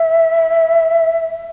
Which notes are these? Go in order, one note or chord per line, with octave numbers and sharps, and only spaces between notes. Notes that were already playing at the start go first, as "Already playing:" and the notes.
Already playing: E5